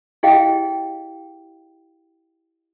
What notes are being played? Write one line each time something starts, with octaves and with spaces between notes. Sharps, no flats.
E4 G4 G#4 D#5 F5 G5